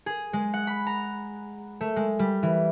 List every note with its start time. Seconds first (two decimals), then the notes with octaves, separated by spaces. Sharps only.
0.06 G#4
0.33 G#3
0.54 F#5
0.67 B5
0.87 A#5
1.81 A3
1.96 G#3
2.19 G3
2.43 E3